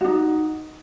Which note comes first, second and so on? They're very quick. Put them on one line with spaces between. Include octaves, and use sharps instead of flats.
F#4 D4 D#4